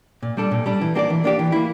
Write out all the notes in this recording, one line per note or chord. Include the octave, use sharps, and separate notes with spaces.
A#2
G3 D4 A4
A#2
G3 D4 A4
E3
A#3 D4 G4 D5
E3
A#3 D4 G4 D5
E3
A#3 E4